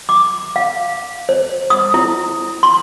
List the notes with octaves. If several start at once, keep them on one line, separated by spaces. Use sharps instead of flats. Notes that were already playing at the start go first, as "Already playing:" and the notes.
D6
F5
C5
D#6
E4
C6